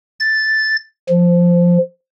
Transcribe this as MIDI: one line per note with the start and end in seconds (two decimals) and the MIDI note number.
0.20 0.77 93
1.09 1.78 53